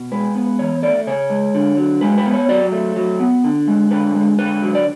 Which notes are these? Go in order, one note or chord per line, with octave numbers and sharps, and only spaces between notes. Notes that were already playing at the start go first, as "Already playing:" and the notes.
Already playing: B2
G#3 B4
B3
E3 C#5
A3 D5
C#3 C#5
G#3
D3
F#3
G#3 B4
B4
B3
C#5
F#3 D5
A3
F#3
B3
D3
G#3
D3 B4
G#3
D3 B4
F#3
D5